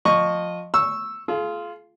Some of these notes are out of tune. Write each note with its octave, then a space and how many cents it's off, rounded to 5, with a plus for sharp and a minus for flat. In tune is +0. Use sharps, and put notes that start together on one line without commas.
F3 +15 D#5 -15 C#6 +0
C#6 -10 E6 +0
F4 -10 G#4 +40